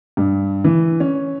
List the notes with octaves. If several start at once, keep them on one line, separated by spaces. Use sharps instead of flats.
G2
E3
C#4